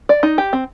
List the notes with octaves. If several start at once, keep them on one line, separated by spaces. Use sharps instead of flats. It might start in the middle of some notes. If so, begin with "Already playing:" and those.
D5
D#4
G4
C4